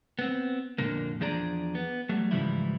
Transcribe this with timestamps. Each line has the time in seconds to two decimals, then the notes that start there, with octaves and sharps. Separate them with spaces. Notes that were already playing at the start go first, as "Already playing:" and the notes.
0.19 B3 C4
0.78 F2 A#2 D3 A#3
1.21 E2 F3 D4 G#4 D5 A#5
1.75 B3
2.09 F#3 G3 A3
2.31 G#2 C#3 E3 F3 G3 E4